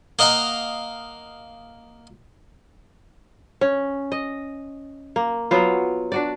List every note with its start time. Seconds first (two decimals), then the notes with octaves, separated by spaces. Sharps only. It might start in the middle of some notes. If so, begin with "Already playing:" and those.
0.19 A#3 D#5 F5 F#5 A#5
3.61 C#4
4.12 D#5
5.16 A#3
5.51 F#3 B3 F4
6.12 D4 F#4 D5